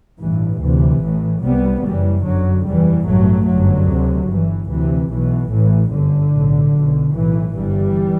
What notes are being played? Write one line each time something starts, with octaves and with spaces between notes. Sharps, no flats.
A1 G2 E3
D2 C3 E3
A1 A2
C2 C3 G3 B3
F#1 F#2 E3 G3
G1 F#2 D3 F#3
F#1 E2 B2 E3 G3
A1 G2 F#3 A3
G1 F#2 D3 F#3
D2 C3
G1 G2 E3
D2 C3 E3
B1 B2 E3
A1 A2 E3
G1 F#2 D3
B1 A2
B1 B2
B1 A2 E3
G1 G2 E3 G3